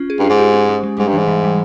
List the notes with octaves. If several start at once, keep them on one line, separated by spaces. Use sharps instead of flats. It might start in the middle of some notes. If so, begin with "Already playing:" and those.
Already playing: C#4 F4
G#4
G2
F4
G#2
G4
C#4
G#3
G#3
G#2 G3
G2
G#2 E3
E3
G3